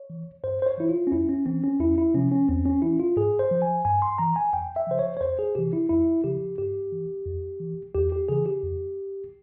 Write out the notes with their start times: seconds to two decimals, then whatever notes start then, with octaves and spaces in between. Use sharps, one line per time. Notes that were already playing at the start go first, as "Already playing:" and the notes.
Already playing: C#5
0.10 E3
0.44 G2 C5
0.62 C5
0.66 C#5
0.77 E3 E4
0.89 F4
1.07 C#4
1.12 F2 E4
1.29 C#4
1.46 E3 C4
1.64 C#4
1.80 E2 E4
1.98 E4
2.14 C3 F3 C#4
2.32 C#4
2.48 E2 C4
2.65 C#4
2.82 E3 E4
2.99 F4
3.17 G#2 G#4
3.39 C5
3.51 F3
3.62 G#5
3.85 G2 G#5
4.02 C6
4.18 E3 A#5
4.36 G#5
4.53 F2 G5
4.76 E5
4.87 C#3 F3 C5
4.99 C#5
5.17 C#5
5.21 F2 C5
5.39 G#4
5.55 C3 E3 G4
5.73 E4
5.89 F2 E4
6.24 C#3 F3 G4
6.58 G2 G4
6.92 E3
7.26 F2
7.60 E3
7.94 E2 G4
8.12 G4
8.29 C#3 E3 G#4
8.46 G4
8.63 F2